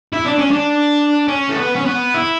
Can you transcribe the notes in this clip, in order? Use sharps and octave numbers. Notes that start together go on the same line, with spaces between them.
E4
D4
C#4
D4
C#4
A3
B3
C#4
B3
E4